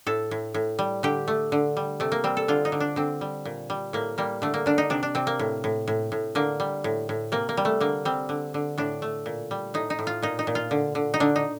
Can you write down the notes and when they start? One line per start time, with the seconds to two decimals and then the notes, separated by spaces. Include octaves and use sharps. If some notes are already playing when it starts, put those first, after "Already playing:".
0.07 A2 A4
0.31 A2
0.54 A2
0.79 G3
1.03 D3 G4
1.28 A3
1.52 D3
1.77 G3
2.00 C3 A3
2.12 A#3
2.24 G3 C4
2.37 A4
2.48 D3 F4
2.65 D#4
2.72 D3
2.80 D4
2.96 D3 C4
3.21 G3
3.45 A#2
3.70 G3
3.93 A2 A#3
4.18 G3 A#3
4.42 D3 A3
4.54 A#3
4.66 D3 D4
4.78 D#4
4.90 C3 D4
5.03 D4
5.15 C3 C4
5.27 A#3
5.39 A2
5.64 A2
5.88 A2
6.12 A2
6.35 D3 A#3
6.60 G3
6.84 A2
7.09 A2
7.32 C3 A#3
7.49 A#3
7.57 G3
7.65 A3
7.80 D3 A#3
8.05 G3 C4
8.29 D3
8.54 D3
8.78 A2 D4
9.02 A3
9.26 A#2
9.51 G3
9.74 A2 D#4
9.90 D#4
9.99 A2
10.07 F4
10.22 A#2 D#4
10.39 D#4
10.47 A#2
10.55 F4
10.71 D3
10.95 D3
11.14 D#4
11.20 D3 D4
11.36 D#4